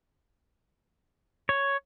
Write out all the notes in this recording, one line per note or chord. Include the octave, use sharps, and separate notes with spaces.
C#5